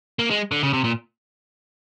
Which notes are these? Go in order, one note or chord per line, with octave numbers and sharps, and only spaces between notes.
A#3
G#3
D3
C#3
C3
A#2